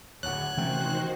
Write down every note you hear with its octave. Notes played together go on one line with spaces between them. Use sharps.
D1 D2 C#5 F#5 F#6 G#6
C3 D#3 E3 A3 C#4 F#4 C5 G5